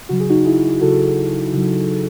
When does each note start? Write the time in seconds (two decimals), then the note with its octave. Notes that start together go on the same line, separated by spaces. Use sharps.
0.09 C#3 F#3 F#4
0.20 G#4
0.29 D#4 F#4
0.46 E4 G#4
0.81 C#3 F#3 F#4 A4
1.53 C#3 F#3